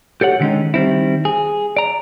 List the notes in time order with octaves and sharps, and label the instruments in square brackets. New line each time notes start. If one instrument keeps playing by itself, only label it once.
[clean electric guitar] G4 A4 C#5 F#5
D3 D#3 G3 G#3 C#4 D#4
D#3 G3 C4 E4
G#4
D5 A#5